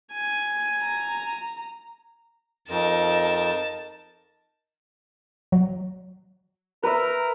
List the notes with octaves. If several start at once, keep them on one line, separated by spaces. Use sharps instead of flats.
G#5
A#5
F2 D#4 A#4 A5
F#3
A#4 B4 E5